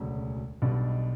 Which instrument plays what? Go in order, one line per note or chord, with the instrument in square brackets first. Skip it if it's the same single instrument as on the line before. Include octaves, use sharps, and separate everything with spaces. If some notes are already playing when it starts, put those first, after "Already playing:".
Already playing: [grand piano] E1 D2 C#3 F#3 C#4
B1 B2 G3 D4